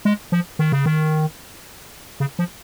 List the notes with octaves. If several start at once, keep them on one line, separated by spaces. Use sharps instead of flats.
G#3
F3
D#3
C#3
D#3
C#3
F3